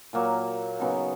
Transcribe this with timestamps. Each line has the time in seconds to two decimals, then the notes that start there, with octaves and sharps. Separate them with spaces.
0.13 A#2 F#3 A#3
0.80 C#3 F#3 B3 D#4